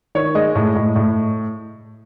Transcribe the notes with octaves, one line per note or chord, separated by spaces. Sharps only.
D#3 C#5
G#3 D#5
A2
A2
A2